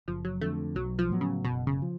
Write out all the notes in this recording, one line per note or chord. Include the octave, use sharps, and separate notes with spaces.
F#1 F3
F#3
F2 D3 A3
B1 F#3
F3
A2 F#3 B3
C#3
F#1 B2
C#3
F3